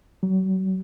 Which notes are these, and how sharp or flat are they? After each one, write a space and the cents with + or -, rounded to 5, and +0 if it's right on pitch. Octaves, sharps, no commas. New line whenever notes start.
F#3 +35